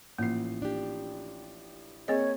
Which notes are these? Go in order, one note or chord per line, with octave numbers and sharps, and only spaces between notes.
A1 F3 A#3 C7
D4 G4
A#3 C4 G#4 C#5 D#5